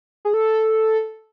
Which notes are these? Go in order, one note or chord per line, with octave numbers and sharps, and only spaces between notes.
G#4
A4